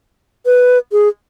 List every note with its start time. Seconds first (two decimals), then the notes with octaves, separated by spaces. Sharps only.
0.46 B4
0.92 G#4